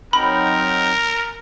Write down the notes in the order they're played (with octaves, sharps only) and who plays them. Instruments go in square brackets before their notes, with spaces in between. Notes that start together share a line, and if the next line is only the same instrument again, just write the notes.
[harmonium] F#3 C4 D#4 [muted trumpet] A#4 [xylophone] B5